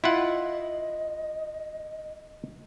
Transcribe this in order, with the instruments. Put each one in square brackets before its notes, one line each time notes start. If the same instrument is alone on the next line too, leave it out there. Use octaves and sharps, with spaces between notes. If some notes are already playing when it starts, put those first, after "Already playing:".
[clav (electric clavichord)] E4 F4 F#5 [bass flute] D#5